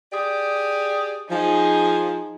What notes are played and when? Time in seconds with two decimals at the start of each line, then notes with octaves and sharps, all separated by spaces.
0.12 G4 G#4 D5
1.30 F3 D#4 G#4